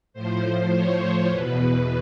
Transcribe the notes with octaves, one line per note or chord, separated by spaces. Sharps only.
A2 F3 C5
C#5
C5
E2 B2 B4